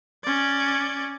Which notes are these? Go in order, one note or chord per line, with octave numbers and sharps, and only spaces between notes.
C#4 D5